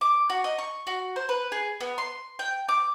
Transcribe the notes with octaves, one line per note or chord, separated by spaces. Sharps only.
D6
F#4
D#5
C#6
F#4
C5
B4
G#4
B3
C6
G5
D6